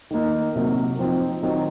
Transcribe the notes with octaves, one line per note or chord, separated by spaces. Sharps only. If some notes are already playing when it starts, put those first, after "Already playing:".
D#3 A#3 D#4
C3 F#3 A#3
F3 C4 D#4
D#3 F#3 C4 D#4